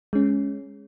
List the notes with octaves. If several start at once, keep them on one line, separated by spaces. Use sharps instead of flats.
G#3 C#4